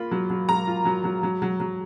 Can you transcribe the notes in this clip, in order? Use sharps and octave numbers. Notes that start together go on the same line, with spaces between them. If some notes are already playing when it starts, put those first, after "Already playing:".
Already playing: A#3 F4 B5
F#3
F#3
F#3 A#5
F4
F#3
F#3
F#3
F#3
F#3